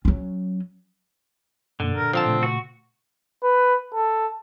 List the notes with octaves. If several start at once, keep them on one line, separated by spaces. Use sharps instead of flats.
F#3 C#4
F#2 B2 D3 A#3
A#2 A#4
F3 C4 F5 A5
A#2 C#3 A3
F#4
B4
A4